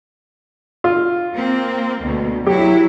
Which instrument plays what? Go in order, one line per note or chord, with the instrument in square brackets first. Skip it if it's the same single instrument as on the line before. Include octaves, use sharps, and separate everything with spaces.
[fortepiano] F4
[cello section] A#3 C4
D2 B2
[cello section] F#3 E4 [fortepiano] G4